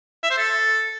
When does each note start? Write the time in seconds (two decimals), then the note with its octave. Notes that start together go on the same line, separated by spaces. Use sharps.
0.23 E5
0.31 C5
0.38 A4